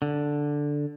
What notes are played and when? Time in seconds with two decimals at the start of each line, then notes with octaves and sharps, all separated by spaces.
0.02 D3